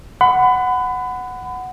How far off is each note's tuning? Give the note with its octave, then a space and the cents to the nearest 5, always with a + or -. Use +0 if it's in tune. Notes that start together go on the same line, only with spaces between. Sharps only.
F#5 +0 B5 +30